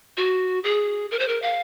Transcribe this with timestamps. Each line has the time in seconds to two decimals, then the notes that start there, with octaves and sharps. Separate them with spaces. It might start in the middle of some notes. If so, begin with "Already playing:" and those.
0.17 F#4
0.64 G#4
1.11 A#4
1.19 C5
1.28 A#4
1.42 F5